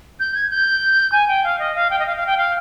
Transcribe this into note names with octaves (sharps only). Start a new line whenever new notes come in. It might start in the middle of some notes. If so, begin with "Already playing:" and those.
G6
G#6
G6
G#5
G5
F5
D#5
F5
G5
D#5
F5
F5
G5
F5